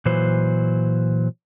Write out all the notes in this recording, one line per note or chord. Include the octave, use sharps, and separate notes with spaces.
A#2 E3 F#3 B4 C5